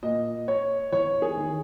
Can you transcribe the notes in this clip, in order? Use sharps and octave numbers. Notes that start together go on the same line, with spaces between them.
A#2 D#5
C#5
E2 C#5
G#4
D#3